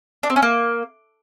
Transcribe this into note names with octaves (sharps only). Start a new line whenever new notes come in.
D4
C4
C#4
A#3